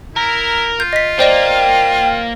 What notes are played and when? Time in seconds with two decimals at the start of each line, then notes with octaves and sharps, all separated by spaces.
0.16 E4 A#4
0.80 F4 G6
0.93 D#5 B6
1.19 A#3 C5 D5 D#5 G5